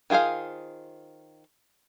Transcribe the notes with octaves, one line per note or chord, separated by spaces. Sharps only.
D#3 F4 G#4 C5 F5